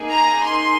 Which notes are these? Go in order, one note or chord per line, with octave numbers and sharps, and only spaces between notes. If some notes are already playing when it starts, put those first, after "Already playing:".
Already playing: A#3 D#4 G#4
A#5
C6